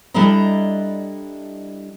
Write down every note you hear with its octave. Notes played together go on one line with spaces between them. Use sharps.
G3 D4 E4 A4 D#5 A#5